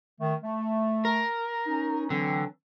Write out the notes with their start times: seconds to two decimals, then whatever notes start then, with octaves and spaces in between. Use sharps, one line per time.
0.20 D#3 A3
0.44 A3
1.05 A#4
1.67 C#4 D#4
2.10 D3 E3 F#3 C4